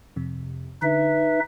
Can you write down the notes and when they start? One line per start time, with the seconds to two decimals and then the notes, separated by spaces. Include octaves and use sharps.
0.16 F2 C3
0.82 D3 D#4 B4 E5